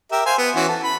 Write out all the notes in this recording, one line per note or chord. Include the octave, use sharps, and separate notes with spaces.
G4 A#4 E5
C5 F5 G#5
B3
E3 C#4 F#4
A4
B5